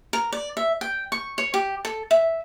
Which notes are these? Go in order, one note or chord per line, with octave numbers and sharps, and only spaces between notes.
A#4
D5
E5
G5
C#6
C#5
G4
A4
E5